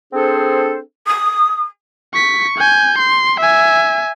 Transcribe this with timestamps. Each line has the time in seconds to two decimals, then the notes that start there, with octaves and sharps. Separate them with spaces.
0.13 C4 D4 G#4 A4 C5
1.07 D#6
2.14 C#6 B6
2.58 G#5 G6
2.99 C6
3.40 E5 G#5